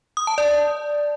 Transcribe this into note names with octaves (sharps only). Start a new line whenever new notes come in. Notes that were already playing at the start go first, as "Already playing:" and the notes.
D#6
A5
D5